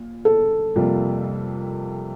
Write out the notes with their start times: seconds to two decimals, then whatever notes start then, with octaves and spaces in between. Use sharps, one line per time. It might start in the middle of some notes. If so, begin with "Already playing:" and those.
Already playing: A#2
0.25 A4
0.76 F2 C3 G3 A#3 F4